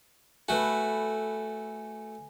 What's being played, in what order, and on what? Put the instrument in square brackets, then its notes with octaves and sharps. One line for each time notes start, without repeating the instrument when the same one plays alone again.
[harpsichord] A3 F#4 [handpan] A4 B4 [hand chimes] G#5